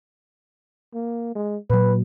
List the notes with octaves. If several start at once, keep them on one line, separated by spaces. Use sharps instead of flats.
A#3
G#3
A#2 F#3 B4